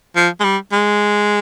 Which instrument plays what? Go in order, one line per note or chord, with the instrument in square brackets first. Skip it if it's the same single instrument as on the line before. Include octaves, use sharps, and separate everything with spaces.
[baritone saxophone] F3
G#3
G3
G#3